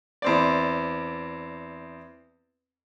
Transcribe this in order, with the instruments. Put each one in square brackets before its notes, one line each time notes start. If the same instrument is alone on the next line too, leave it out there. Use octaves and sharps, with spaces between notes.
[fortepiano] E2 C4 D5